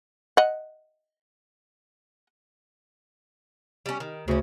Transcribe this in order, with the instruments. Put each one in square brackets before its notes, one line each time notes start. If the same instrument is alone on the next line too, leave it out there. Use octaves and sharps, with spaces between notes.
[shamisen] D#5 F#5
[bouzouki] G3 C#4
D#3
[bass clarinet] D2 [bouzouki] C#3 C#4